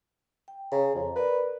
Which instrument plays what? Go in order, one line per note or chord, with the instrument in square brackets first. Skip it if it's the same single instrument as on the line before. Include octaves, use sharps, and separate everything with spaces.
[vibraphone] G5
[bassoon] C#3 [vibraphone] A#5
[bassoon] F2
[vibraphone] A#4 D5 [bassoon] B4